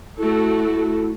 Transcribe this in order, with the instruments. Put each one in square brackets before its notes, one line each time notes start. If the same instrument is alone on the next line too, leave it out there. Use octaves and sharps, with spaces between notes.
[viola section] A3 F#4 A4 [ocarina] E4